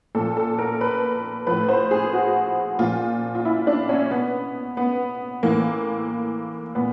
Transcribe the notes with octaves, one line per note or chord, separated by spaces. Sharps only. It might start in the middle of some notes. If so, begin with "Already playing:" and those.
A#2 F3 A4
A4
A#4
B4
A2 F3 B4
C5
G#4
F#4
A#2 F3 F4
F4
E4
D4
C#4
B2 B3
B3
A2 E3 A#3
A#2 B3